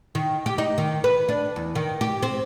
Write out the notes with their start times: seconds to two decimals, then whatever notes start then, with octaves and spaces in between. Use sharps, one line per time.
0.15 D#3
0.46 G4
0.58 D#4
0.78 D#3
1.04 B4
1.29 D4
1.56 E2
1.75 D#3
2.01 G4
2.23 C4